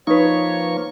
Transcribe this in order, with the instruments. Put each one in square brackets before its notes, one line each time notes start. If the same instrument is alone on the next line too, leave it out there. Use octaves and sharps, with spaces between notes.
[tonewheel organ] F3 A#3 C#6 [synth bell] D#4 B4 [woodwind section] C#5